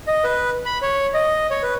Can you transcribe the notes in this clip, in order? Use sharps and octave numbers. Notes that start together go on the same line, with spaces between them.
D#5
B4
B5
C#5
D#5
C#5
B4